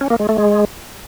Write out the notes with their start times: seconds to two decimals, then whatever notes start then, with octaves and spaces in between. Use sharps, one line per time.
0.01 C#4
0.10 A#3
0.20 G#3
0.29 A3
0.38 G#3